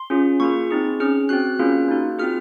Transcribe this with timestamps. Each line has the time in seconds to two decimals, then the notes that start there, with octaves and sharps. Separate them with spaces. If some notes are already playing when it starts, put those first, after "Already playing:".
Already playing: C6
0.10 C#4 F4 G#4
0.40 A#3 F4 G#4 C#6
0.71 C4 D#4 G#4
1.00 C#4 G#4 F6
1.29 C4 F#4 F#6
1.59 A#3 C#4 F4 G#4
1.89 A#3 D#4 F#4
2.19 C4 F4 G#4 F6